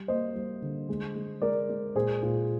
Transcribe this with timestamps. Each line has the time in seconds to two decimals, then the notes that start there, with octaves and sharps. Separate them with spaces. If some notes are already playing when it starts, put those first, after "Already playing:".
Already playing: G3
0.08 A#3 C5 D#5
0.36 G3
0.62 D3
0.89 G#3
1.15 G#3
1.42 G#3 A#4 D5
1.69 G#3
1.95 A#2 G#4 C5
2.22 A#2 F4 G#4